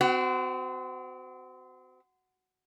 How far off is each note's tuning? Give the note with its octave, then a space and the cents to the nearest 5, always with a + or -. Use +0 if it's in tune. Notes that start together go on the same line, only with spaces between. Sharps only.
C4 -35 F#4 +10